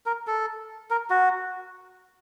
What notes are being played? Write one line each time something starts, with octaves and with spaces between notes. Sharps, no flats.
A#4
A4
A#4
F#4